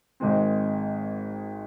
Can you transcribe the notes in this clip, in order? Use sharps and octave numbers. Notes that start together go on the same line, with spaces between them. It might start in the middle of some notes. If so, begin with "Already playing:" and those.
G#1 G#2 D#3 G#3 C4